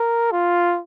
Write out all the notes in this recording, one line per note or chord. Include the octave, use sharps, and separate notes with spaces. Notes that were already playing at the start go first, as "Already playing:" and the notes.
Already playing: A#4
F4